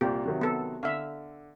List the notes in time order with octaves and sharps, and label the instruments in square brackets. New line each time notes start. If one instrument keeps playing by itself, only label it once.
[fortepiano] C2 A#2 [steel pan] G4
[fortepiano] C3 D#3 F#3
[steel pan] B3 A4
[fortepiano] D3 [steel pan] E5 F5